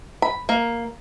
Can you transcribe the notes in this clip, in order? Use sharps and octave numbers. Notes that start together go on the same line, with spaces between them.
B5
A#3